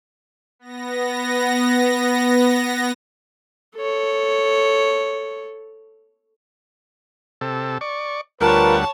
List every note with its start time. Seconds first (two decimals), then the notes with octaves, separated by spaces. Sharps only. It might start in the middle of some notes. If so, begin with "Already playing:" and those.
0.59 B3 A#6
3.76 A4 C#5
7.41 C3 A4
7.81 D5 C#6
8.41 D2 G3 F4 A#4 B4 C#5 F#5 A5